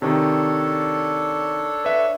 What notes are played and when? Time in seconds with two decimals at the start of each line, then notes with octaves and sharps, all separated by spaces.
0.02 C3 D#3 D4 A4 C#5
1.85 B4 E5